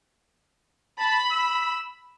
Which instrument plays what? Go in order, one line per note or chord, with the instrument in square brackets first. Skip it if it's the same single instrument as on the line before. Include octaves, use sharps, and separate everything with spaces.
[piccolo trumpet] A5 [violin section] B5
[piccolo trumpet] E6